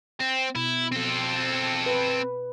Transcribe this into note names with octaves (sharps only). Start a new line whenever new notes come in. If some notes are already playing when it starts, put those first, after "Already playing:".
C4
B2 E4
C4 A4
B4